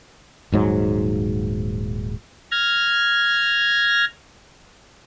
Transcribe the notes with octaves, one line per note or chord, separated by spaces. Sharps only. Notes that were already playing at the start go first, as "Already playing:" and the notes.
D#1 G#2 F#3
F6 G#6 A#6